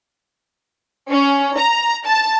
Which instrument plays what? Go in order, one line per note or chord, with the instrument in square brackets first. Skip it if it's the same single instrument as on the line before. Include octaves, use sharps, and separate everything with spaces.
[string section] C#4
A#5
A5